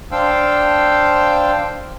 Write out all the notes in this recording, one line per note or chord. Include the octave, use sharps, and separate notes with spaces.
D4 C5 F5 G5 E6